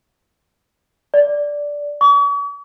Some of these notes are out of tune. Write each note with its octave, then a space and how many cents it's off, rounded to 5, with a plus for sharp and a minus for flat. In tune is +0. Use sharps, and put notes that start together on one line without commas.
D5 -10
C#6 +45